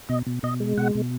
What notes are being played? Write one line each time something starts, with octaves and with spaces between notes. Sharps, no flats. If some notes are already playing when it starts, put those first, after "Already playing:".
B2 D#5
B2
B2 D#5
G#3
B2 F#5
B2